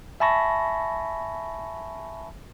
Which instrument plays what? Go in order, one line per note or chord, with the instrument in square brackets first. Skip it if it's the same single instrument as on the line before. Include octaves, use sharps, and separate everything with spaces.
[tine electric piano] E5 G#5 A5 B5 C#6 A#6